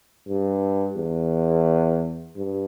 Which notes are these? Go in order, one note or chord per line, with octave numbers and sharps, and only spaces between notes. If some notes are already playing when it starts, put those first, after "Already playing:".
G2
E2
G2